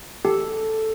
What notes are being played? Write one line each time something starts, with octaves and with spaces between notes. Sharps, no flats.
G4 A4